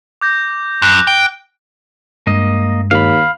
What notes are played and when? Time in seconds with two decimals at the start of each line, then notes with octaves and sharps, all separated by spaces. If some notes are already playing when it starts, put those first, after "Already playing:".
0.21 D6 G6 A#6
0.82 F#2 F#6
1.07 G5
2.27 G2 G#3 A#3 D#5
2.91 D#2 F5 B5